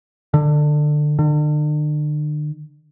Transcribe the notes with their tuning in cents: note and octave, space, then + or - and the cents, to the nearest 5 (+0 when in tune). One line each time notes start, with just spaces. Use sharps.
D3 +20
D3 +40